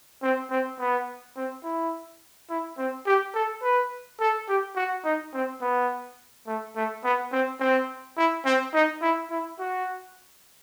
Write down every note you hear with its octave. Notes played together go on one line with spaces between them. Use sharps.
C4
C4
B3
C4
E4
E4
C4
G4
A4
B4
A4
G4
F#4
D#4
C4
B3
A3
A3
B3
C4
C4
E4
C4
D#4
E4
E4
F#4